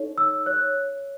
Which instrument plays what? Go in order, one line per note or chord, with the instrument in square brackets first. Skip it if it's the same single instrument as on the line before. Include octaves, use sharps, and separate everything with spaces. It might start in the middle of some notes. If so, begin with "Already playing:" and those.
Already playing: [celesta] D#4 A4 C#5
E6
C#5 F#6